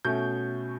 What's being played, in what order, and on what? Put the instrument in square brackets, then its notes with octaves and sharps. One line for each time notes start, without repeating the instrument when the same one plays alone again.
[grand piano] B2 A3 C#4 G6